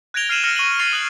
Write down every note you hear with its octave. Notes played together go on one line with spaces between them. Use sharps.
F#6 G#6 A#6 D7 F7 G7
F6 C7 D#7 E7 F#7
F6 A#6 C#7 F7 F#7
C#6 A#6 D#7 E7 F#7
C#6 A6 A#6 C7 F7 G7
D#6 F#6 F#7